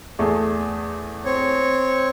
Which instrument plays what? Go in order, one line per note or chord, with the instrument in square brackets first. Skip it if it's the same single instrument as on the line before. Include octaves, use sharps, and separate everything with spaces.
[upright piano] E2 A3 G#4
[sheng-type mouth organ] C4 C#5